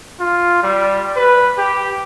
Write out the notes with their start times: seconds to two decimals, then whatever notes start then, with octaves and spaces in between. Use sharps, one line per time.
0.20 F4
0.63 G3
1.16 B4
1.58 G4